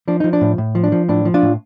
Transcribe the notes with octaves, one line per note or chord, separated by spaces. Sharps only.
F3 D4
F3 D#4
D4
A2
A2
F3
D4
F3
A2 D4
F3
D4 F4
A2